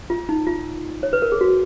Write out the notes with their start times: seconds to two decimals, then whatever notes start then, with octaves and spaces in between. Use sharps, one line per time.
0.10 F4
0.29 D#4
0.47 F4
1.03 C#5
1.13 B4
1.22 A#4
1.32 G#4
1.41 F#4